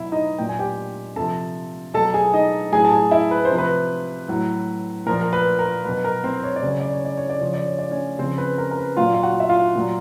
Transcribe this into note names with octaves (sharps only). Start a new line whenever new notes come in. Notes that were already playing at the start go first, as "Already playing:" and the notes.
Already playing: B2 F#3 E4 E5
D#4 D#5
A#2 F#3 G5
G#5
G4 G5
C3 F3 A4 A5
B2 F#3 A4 A5
G#4 G#5
D#4 D#5
A2 F#3 G#4 G#5
A5
G#4 G#5
E4 E5
B4
C5
C3 F3
B4
A2 F#3
A#2 F3 A#4
A#4
B4
A#4
B2 F#3 B4
A#4
C4 C5
C#5
D5
C#3 F#3
C#5
D5
C#5
D5
C#5
D5
C#3 F3 C#5
D5
C#5
D5
C#4 C#5
C#3 F3 C4 C5
B4
A#4
A#4
B4
A#2 F#3 F4 F5
F5
F#4 F#5
E5
F4 F5
A#2 F#3